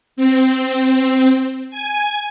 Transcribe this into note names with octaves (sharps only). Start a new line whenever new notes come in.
C4
G#5